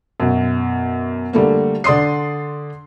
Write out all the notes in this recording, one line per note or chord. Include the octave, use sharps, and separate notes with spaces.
F#2 B2
D3 G3 A3 A#3
D3 D5 C6 D#6 C7